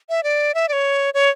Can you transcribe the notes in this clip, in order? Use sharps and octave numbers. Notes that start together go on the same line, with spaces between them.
E5
D5
E5
D5
C#5
C#5